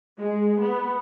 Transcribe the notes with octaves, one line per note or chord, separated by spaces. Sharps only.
G#3
B3